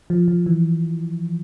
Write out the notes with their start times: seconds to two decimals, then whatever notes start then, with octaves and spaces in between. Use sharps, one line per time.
0.10 F3
0.28 F3
0.46 E3